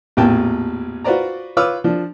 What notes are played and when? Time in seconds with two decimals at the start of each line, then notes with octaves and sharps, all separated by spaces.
0.17 A1 E2 A#2 G5 A5
1.04 F4 F#4 B4 C5 D5 A#5
1.57 F4 B4 C#5 D6 E6 F6
1.84 F3 D4